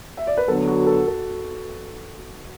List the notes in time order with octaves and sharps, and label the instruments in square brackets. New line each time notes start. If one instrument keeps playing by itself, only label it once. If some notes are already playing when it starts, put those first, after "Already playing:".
[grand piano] E5
D5
B4
[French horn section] D3 F#3 B3 [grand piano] A4
[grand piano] F#4
A4
A4